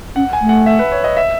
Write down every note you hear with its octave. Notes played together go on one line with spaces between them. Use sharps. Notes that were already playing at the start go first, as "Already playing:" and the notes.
C#4 F#5
G#5
A3
F#5
E5
B4
C#5
D#5
E5